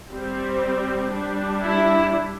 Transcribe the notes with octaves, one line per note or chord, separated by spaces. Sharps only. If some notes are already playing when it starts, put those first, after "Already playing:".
G3 C4
G3 D4
E4